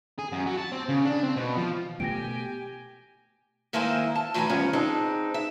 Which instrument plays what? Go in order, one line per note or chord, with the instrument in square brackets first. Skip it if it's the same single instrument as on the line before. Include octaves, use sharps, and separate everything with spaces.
[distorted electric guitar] G#4
F#2
F#3
A5
C4
C#3
D4
C4
B2
F3
[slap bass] B2 A3 B3 [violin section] G4 G#5 [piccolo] G5 [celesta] A#6 D7
[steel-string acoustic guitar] G#2 D#3 A#3 E4 C5 G#5
A5
A2 D#3 E3 F#3 G#5 A#5
G2 D#3 F3 B3 C#4
G#3 C4 D4 D#4
E5